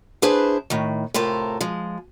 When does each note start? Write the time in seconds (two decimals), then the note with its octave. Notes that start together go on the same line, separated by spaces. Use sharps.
0.22 D4 E4 G#4 B4 C5
0.70 A2 D#3
1.14 A2 C3 F4 A4 A#4
1.61 F3 G#3